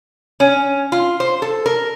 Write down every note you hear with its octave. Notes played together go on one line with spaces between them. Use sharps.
C#4
F4
C5
A4
A#4